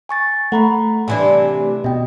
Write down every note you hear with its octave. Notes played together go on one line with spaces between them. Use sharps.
G#5 C#6 A6
A3 F#5 A#5 B5
C3 E3 D4 G#5 B5
B2 D#5 G5